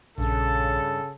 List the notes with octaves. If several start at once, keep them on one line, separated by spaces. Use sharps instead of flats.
A#1 G2 C#3 D4 A4